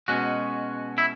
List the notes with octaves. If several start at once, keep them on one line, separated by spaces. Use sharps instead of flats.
B2 G#3 C#4 F#4
E4